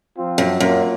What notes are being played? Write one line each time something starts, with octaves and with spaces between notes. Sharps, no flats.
F3 C4 F4
F#2
F#2 A#2 F#3 A#3 F4